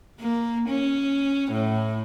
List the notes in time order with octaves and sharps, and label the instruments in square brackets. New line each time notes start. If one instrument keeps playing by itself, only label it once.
[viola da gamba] A#3
C#4
A2